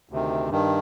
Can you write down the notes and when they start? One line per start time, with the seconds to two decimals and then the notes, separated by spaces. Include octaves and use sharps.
0.09 D2 C3 D#3
0.50 G2 D#3